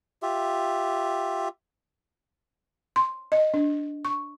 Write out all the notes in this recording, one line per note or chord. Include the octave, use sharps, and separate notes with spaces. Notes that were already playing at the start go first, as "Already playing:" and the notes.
F4 G4 E5
C6
D#5
D4
C#6